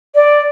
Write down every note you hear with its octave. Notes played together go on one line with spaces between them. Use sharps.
D5